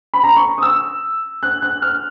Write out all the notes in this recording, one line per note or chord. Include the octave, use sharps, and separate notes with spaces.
B5
A#5
C#6
D#6
E6
F#6
F#6
F6